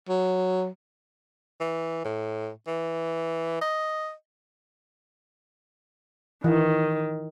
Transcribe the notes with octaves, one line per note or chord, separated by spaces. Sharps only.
F#3
E3
A2
E3
D#5
D#3 E3